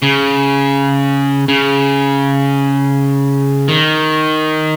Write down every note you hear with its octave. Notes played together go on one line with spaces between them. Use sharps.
C#3
C#3
D#3